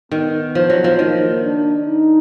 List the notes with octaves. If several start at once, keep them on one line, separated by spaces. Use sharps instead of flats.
D#3 B3
F3
F#3
F3
D#3 A#3
D4
D#4